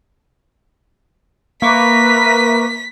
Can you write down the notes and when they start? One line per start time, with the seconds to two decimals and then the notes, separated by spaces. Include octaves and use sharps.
1.62 A#3 A#4 B4 E5 C#6 D6 B6